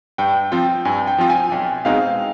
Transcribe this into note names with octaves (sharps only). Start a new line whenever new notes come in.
G2 G5
F3 C4 F4 G5
G2 G#5
G5
F3 C4 F4
G#5
B1 G5
B2 G#3 C4 D#4 F5